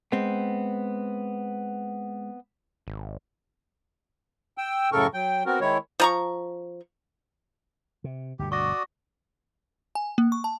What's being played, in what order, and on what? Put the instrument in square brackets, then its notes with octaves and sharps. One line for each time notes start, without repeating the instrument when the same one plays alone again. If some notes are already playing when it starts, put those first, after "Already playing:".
[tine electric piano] G#3 [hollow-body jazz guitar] B3 C4
[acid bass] G#1
[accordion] G5 E6
F#2 A2 C#3 A4 A#4 C#6
F#3 G5
B3 C4 F#4 A#4
D#3 G#3 E4 C#5
[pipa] F3 A#5 C#6
[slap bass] C3
[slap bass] G1 D2 B2 [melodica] G4
[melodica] F#4 D5 D#6 [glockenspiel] C#6 A#6
[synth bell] G#5
A#3
C#6
A5